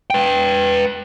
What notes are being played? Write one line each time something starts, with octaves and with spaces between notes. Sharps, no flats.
B4 G5